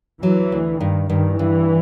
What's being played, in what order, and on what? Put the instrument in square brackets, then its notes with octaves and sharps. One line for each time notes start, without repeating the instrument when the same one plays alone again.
[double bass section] E3 [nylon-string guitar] F#3
[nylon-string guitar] D2
[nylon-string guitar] G2 [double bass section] D#3
[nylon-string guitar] G2 [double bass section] D#3
[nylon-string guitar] G2 [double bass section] E3